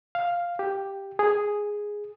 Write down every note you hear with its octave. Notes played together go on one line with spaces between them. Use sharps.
F5
G4
G#4